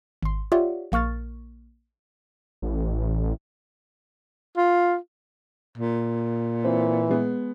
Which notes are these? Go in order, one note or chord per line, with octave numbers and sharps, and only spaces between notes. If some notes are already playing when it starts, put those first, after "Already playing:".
G#1 C6
F4 G4 C#5 D5 E5 F#5
A#1 A#3 C#6 F6 A6
A1
F4
A#2
E3 C4
G#3 B3